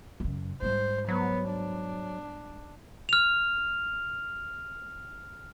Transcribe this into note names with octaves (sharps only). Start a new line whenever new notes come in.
F#2 C#3
G#2 G3 C5
F#3 B3
D4
F6 F7